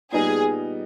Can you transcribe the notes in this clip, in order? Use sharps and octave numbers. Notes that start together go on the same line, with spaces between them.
A#2 G3 B3 D#4 G#4